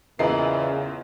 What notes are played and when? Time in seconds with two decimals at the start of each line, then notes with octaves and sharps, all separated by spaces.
0.19 E2 A#2 C#3 E3 F4 A#4 D#5 C7